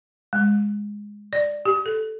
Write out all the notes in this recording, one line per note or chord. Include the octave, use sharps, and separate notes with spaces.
G#3
D5
G4
A4